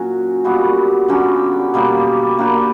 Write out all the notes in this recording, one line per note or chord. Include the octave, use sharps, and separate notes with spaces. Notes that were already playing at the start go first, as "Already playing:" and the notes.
Already playing: A#2 F#3 C#4 F#4
A#2 G3 B3 F#4
D3 F#3 C#4 G4
B2 G3 A#3
A#3 D4 G4 B4